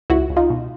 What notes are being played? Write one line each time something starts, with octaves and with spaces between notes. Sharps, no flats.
C#2 E4 F#4
C#2
D#4 F4
B2